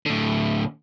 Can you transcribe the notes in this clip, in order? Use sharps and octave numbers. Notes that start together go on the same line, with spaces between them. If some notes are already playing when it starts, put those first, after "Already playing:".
A2 D3